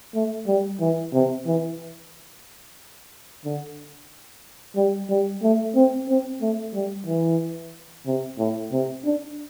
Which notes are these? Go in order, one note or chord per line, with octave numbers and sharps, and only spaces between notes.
A3
G3
E3
C3
E3
D3
G3
G3
A3
C4
C4
A3
G3
E3
C3
A2
C3
D4